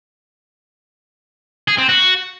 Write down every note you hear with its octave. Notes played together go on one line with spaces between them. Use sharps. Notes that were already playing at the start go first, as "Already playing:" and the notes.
G#4
C4
F#4